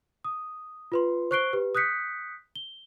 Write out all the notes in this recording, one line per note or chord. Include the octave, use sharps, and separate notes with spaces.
D#6
F4 B4 C6
C5 C#6 F#6 C7 D7 G7
G4 B4
D#6 F#6 G6 B6 C#7
G7